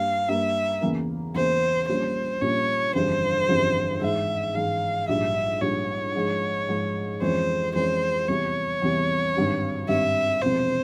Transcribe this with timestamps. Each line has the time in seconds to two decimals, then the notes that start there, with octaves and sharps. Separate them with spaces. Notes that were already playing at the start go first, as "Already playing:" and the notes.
Already playing: G2 G3 A#3 F5
0.28 G2 G3 A#3 E5
0.81 E2 C#3 E3 A#3
1.34 E2 C#3 E3 A#3 C5
1.88 A#1 A#2 G3 C#4 C5
2.41 A#1 A#2 G3 C#4 C#5
2.95 G1 F2 C#3 E3 G3 C5
3.49 G1 F2 C#3 E3 G3
4.01 G#2 E3 G#3 E5
4.55 G#2 E3 G#3 F5
5.08 A#1 G#2 G3 E5
5.61 A#1 G#2 G3 C#5
6.15 G#2 F3 G#3
6.69 G#2 F3 G#3
7.21 F2 E3 G#3 C#4 C5
7.74 F2 E3 G#3 C#4 C5
8.28 E2 C3 E3 G3 C#5
8.82 E2 C3 E3 G3
9.35 G#1 G2 G3 C4
9.88 G#1 G2 G3 C4 E5
10.42 E1 E2 C3 F3 C4 C5